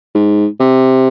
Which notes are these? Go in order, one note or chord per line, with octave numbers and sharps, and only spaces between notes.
G#2
C3